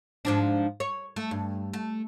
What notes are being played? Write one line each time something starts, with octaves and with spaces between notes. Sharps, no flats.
G#2 F3 D4
C#5
A3
G2
A3